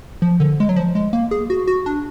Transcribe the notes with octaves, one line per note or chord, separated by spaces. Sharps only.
F3
D3
G#3
F#3
F3
G#3
A#3
G#4
F#4
F#4
D4